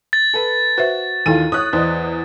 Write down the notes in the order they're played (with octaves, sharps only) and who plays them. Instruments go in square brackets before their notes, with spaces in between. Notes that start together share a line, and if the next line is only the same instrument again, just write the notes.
[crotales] A6
[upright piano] A4 B4
[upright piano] F#4 [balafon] B4 C5 E5
[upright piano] D#2 D#3 F4 [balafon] E4 A4 G#5 [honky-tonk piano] D#7
[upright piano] C#5 [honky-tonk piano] D#6 F#6
[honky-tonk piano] E2 [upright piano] C5 D5 D#5